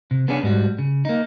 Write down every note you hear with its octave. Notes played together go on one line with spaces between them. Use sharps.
C3
B3 C#4 D4 G#4 C#5 F#5
G#2 G3 F#4
C#3
A#3 D#4